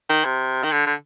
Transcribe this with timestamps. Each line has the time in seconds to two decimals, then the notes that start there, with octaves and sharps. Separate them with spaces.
0.10 D#3
0.25 C3
0.64 D#3
0.72 D3
0.87 D3